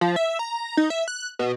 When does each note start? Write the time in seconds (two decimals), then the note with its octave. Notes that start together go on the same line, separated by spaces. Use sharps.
0.01 F3
0.16 E5
0.39 A#5
0.77 D#4
0.90 E5
1.08 F#6
1.39 B2